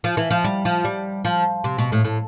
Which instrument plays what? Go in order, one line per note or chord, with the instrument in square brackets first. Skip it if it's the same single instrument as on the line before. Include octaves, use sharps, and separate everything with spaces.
[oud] F3
E3
F3
G3
F3
G3
F3
C3
B2
A2
A2